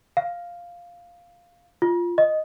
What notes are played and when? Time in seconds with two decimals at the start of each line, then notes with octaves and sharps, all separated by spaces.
0.17 F5
1.82 F4
2.18 D#5